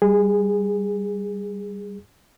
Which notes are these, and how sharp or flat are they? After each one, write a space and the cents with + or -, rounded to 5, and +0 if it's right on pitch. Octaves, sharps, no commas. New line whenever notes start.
G3 +0 G#4 -15